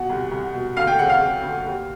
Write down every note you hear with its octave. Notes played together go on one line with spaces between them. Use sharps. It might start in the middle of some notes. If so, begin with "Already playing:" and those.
Already playing: B2 F#5
C2
C2
B2
D2 F5
G5
C#3 F#5
F5
C#3
D2
D#2